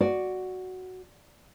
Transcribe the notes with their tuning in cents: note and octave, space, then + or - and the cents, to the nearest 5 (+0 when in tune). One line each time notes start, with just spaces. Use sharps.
F#4 +0 D5 +0